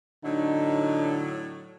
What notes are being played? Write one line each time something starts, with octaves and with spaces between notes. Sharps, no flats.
A2 D3 F#3 D#4